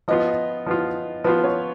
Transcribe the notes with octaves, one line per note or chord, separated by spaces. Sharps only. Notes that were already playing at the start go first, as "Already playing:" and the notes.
F3 B3 F4 D#5
F3 B3 F4
F3 B3 F4 B4
C#5